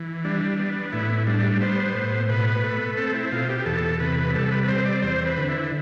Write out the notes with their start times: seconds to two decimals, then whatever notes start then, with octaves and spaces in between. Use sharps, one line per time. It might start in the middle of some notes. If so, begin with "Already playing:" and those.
Already playing: E3
0.24 G3 D4
0.59 B3
0.92 A2 E4
1.27 G3 D4
1.61 B3 C5
1.95 A2
2.29 B2 B4
2.63 A3
2.97 C4 A4
3.15 E4
3.32 B2 F4
3.49 G4
3.66 E2 A4
4.00 C3 B4
4.34 G3 A4
4.51 B4
4.63 B4
4.68 C4 C5
4.86 D5
5.03 E2 C5
5.25 B4
5.37 D3
5.49 E4